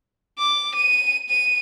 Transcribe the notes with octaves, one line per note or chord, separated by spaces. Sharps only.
D6
D#7
D#7